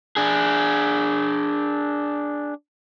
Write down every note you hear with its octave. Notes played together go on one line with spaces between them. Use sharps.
D4 G#4